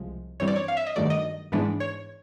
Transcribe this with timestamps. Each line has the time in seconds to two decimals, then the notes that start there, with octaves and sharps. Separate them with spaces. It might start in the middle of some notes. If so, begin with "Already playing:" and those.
Already playing: C2 C3 F3 G#3
0.40 G2 E3 G3 C4 C#5
0.48 D5
0.56 C#5
0.68 F5
0.77 E5
0.87 D#5
0.96 G2 D#3 F#3 A3 D5
1.10 D#5
1.52 G#2 E3 G#3 B3 D4
1.80 C#5